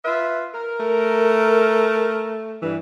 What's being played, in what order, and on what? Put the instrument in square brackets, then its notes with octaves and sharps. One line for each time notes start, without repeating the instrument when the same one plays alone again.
[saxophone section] F4 B4 E5
A#4
[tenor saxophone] A3
[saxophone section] G2 E3